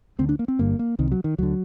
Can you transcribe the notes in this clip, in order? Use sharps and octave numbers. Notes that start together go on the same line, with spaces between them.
D2 D3 C4
D4
A#3
C4
G1 G2 D3 A#3
A#3
C2 C3 D#3
F#3
D#3
D2 D3 F#3